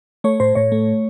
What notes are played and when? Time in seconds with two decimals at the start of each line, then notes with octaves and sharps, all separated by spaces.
0.24 A3 C#5
0.40 A2 C5
0.55 A2 C#5
0.72 A3